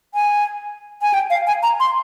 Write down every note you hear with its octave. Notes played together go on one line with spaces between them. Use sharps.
G#5
G#5
G5
F5
G#5
A#5
C6